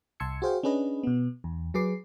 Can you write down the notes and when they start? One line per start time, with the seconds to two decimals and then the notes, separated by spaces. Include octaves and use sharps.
0.20 C2 A5 C6 E6 G#6 C#7
0.42 F#4 G#4 C5 F5 G5
0.63 C#4 D4 G#4 B4 D#5
1.03 B2 B3
1.44 E2
1.74 F#3 G#4 B4 D6 C7